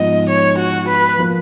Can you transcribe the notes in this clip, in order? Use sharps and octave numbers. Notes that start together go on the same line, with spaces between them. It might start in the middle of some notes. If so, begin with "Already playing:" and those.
Already playing: G#2 F3 B3 F4 D#5
C#5
F#4
B4
F3 A#3 F4 B4